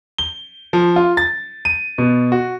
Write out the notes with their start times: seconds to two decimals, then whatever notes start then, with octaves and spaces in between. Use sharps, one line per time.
0.18 G7
0.73 F3
0.96 F4
1.17 A6
1.65 D#7
1.98 B2
2.32 F#4